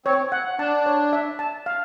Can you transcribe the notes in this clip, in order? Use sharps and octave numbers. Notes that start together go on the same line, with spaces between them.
C4 C#5
F#5
D4 A5
C#5
E5
A5
F5